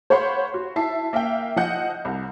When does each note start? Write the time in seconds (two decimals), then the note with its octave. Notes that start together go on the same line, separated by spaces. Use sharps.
0.10 C5 C#5 F5 F#5 B5 C6
0.54 F#4
0.76 E4 E5 A5 C7
1.13 A#3 E5 F5 G5
1.56 F3 D#5 F#5 G6
2.05 C2